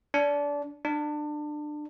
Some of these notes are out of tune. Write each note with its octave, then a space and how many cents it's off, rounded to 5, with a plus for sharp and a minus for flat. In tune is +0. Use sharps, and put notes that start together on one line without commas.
D4 -25
D4 +25